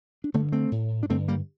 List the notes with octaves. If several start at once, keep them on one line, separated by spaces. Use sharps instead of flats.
D4
G2 D3 A3 C4
A3 C4
A2
D4
G2 D3 A3 C4
G3 A#3